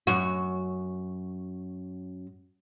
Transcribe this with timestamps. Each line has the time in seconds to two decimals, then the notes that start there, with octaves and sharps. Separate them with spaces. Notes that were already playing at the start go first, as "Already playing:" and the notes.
0.07 F#2 F#4